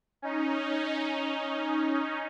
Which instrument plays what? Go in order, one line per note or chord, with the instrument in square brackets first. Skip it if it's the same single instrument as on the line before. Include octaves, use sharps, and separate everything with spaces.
[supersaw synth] C#4 D#4